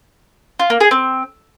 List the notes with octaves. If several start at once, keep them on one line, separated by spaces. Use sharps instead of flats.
F4
A#3
G#4
C4